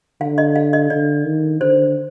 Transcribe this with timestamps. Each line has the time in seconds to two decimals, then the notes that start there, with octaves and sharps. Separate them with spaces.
0.21 D3 F5
0.38 D#5
0.56 F5
0.73 D#5
0.90 D3 D5
1.26 D#3
1.60 D3 C5